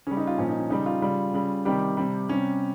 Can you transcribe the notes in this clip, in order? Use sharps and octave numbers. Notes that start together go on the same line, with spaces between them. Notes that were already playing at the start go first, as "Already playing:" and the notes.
C#3 G3 C#4
D#4
F4
A#2 F3 C#4
D#4
C#4
C#3 G3 D#4
F4
C#3 G3
C#3 G3
C3 D#3 G3 G4
C3 G3
C3 G3 C#4